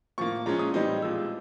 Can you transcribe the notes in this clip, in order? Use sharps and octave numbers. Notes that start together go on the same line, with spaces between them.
A2 F3 A#3 C#6
A#2 F3 G#3 C#4 A#5
D#6
A2 E3 G3 C4 D#4
A#2 F3 G#3 E6